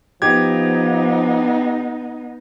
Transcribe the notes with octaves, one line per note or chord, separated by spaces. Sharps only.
F3 B3 D#4 G4 G#6